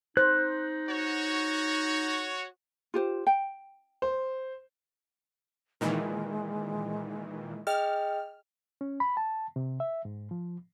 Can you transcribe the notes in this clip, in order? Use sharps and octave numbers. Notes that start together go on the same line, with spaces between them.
D#4 C5 F#6
F#4 C#5
F4 G4 C5
G5
C5
A#2 D#3 E3 G#3
G#4 D#5 G5 F6
C#4
B5
A5
C3
E5
G#2
F3